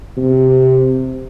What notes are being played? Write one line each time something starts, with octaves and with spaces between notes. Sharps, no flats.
C3